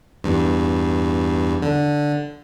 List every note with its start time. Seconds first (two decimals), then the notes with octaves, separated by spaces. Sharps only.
0.24 E2 G2
1.62 D3